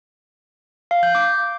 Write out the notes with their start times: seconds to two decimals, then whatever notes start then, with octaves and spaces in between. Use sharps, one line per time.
0.91 F5
1.03 G6
1.15 D6